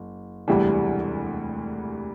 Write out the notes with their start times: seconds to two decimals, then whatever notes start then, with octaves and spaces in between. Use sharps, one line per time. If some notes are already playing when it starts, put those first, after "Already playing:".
Already playing: F#1
0.48 E1 D2 C3 E3 G3